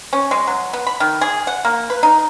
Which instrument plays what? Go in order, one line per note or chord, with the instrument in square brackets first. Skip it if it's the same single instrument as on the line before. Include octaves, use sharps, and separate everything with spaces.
[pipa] C#4
G#3
F#3
B3
B5
D#3
G#4
F#5
A#3
B4
D#4